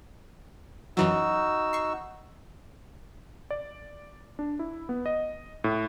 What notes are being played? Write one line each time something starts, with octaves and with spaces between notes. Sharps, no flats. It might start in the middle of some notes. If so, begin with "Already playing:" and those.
F#2 E3 F#3 D#4 F#4 E6
C#6 C7
D5
D4
E4
B3
D#5
A2